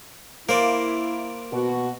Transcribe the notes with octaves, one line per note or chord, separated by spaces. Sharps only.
A#3 E4 A#4 C5 D5
B2 F#4